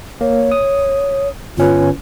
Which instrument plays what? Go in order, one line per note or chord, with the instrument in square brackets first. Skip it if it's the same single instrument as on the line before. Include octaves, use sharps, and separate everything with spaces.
[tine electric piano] A#3 [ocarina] C#5
[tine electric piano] D#6
[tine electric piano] G1 C#4 B4 [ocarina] F4